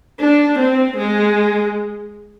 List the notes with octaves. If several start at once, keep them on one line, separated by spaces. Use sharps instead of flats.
D4
C4
G#3